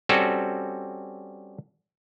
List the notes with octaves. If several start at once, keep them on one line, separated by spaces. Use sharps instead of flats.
G3 C4 C#4 F#4 A4